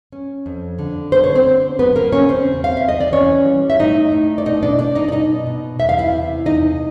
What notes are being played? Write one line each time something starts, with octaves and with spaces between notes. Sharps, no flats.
C#4
F2
D3
B3 C5
C#5
C4 C5
D3
F#3 B3 B4
A#3 A#4
C#3 C#4 C#5
C4 C5
E2
F5
E2 E5
D#5
D5
E3 C#4 C#5
G3
E5
A2 D#4 D#5
A2
D5
B2 D#4 D#5
D4 D5
B2 D4 D5
D#4 D#5
D5
B2 D#4 D#5
B2
E2 E5
F5
E4 E5
C3
E2 D#4 D#5